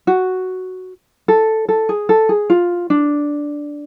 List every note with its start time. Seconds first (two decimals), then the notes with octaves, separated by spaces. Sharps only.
0.07 F#4
1.28 A4
1.69 A4
1.89 G#4
2.09 A4
2.29 G#4
2.50 F4
2.90 D4